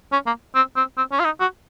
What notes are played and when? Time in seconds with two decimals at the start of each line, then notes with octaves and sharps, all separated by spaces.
0.12 C#4
0.26 A#3
0.55 C4
0.76 C4
0.97 C4
1.12 C#4
1.20 F4
1.25 D#4
1.40 F#4